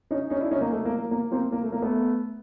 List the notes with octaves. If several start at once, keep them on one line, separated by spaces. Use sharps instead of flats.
C#4 D#4
C#4 D#4
D4 E4
C#4 D#4
A#3
A3
A#3
A#3
A#3
A#3 C4
A#3
A3
A#3
A3 B3